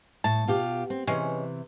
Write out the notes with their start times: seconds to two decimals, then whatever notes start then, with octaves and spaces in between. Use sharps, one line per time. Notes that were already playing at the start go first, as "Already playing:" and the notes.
0.24 A2 A5
0.48 B2 F4 G4
0.90 C4
1.07 C3 E3 G#3 C#4